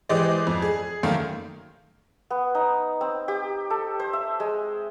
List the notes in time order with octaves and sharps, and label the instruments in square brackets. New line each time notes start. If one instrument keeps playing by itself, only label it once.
[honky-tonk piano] E3 G#3 G4 C5 D5 D#5
F2
G#4
F#2 D#3 A3 A#3
[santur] B3
D#4
C4
G4
A4
C5
E5
G#3